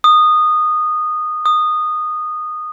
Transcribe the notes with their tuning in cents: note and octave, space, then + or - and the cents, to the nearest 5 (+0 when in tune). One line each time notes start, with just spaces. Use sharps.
D#6 -15
D#6 -15